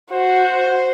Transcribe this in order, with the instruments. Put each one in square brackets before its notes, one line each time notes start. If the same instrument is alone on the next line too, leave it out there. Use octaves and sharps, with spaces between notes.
[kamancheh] F#4 [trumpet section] C5